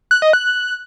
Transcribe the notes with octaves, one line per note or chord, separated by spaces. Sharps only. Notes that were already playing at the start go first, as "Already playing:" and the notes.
F#6
D#5
F#6